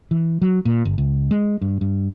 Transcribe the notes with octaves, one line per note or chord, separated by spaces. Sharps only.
E3
F#3
A#2
G1
C#2
G#3
G2
G2